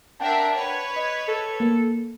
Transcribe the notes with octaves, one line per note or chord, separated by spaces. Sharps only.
D4 A#4 E5 F#5 G5 A5
B4 C#5
D#5
A4
A#3